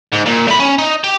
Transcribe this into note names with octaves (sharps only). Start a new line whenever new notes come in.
G#2
A#2
A3 B5
C#4
D#4
G4